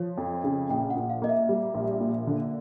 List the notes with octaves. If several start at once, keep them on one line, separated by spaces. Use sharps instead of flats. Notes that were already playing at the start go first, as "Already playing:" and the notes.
Already playing: F3 C#5
F2
C#3
A#1 G5
F#5
A#2
F5
A#3 D#5
E5
G3
A#1
A#2
D3